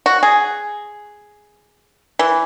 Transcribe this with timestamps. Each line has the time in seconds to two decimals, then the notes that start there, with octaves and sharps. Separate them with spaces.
0.06 F#4
0.23 G#4
2.19 E3